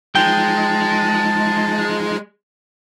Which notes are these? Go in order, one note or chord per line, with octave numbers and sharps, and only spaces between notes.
F3 G#3 D#4 F4 G5 A5